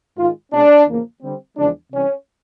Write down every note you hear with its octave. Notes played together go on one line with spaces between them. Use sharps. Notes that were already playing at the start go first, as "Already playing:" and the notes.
G#2 D#3 G#3 F4
B2 G#3 C#4 D4
E2 C#3 F3 A#3
D3 G3 C4
E2 C#3 F3 G#3 D4
C3 E3 G3 C#4